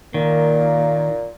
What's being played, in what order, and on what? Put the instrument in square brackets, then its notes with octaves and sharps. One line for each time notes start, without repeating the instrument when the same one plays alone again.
[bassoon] A#2 [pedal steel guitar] D#3 [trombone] A#3